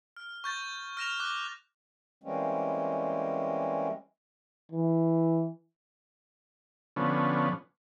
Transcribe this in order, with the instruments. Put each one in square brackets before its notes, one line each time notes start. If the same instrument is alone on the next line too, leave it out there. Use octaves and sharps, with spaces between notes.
[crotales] F6
C#6 G6 A6
F6 A#6 E7 F7
D6 F#6
[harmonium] E3 G3 G#3 A#3 C4 C#4
[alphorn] E3
[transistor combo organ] D3 F3 B3 C#4